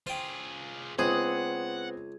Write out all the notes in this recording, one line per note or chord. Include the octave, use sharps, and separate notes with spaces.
F4 G#4 C5 G5
C#2 B3 C4 G#4 F#5